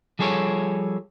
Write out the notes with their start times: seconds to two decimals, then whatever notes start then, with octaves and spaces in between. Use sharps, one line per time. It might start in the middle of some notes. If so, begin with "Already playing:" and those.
0.19 F3 G3 G#4 A4 C#5